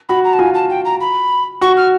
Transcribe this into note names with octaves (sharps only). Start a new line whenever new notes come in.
F#4 B5
A#5
A5
F4 G#5
A5
G5
A#5
B5
F#4 C#6
F6